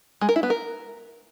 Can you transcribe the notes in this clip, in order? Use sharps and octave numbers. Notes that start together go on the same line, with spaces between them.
G#3
A#4
E4
B3
A#4